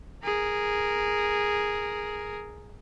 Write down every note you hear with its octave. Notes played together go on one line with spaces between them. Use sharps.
G#4 A#4